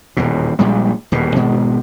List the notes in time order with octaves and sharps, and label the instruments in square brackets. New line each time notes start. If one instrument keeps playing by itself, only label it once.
[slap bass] D#1 E2 B2
A#1 A#2 G3 G#3
D#1 E2 B2
G#1 B2 G#3